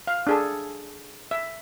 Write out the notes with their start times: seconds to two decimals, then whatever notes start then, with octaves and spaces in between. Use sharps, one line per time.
0.07 F5
0.27 D4 G#4 A4
1.31 E5